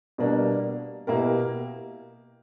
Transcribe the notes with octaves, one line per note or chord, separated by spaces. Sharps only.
B2 G3 A#3 D4
B2 A#3 E4 G4 A#4